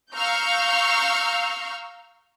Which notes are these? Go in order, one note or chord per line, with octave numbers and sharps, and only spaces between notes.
F5 A#5 C#6 E6 F6 G6